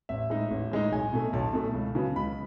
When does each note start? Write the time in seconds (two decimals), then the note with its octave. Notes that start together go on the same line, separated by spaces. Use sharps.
0.09 A1 E5
0.30 A2 G#3 D#4
0.51 A1
0.72 A2 G#3 D#4
0.92 B1 G#5
1.13 B2 A3
1.33 B1 A5
1.53 B2 A3
1.74 C#2
1.95 C#3 F#3 B3
2.16 C#2 B5